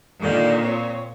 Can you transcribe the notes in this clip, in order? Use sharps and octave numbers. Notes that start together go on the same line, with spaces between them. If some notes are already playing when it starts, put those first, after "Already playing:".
A#2 D3 D#3
C4 C#5